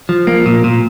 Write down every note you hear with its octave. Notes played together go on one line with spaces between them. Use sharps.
F3
A#3
A#2
A#2